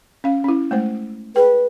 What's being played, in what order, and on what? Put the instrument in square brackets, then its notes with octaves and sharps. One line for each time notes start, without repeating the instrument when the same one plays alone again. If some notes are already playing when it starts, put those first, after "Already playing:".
[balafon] C#4 F5
C#4 E4
G#3 A3 C5
[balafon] G#4 G5 [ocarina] B4